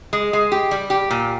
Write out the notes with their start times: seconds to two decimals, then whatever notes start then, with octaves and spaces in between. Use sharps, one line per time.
0.13 G#3
0.33 G#3
0.52 G4
0.71 G3
0.90 G4
1.10 A#2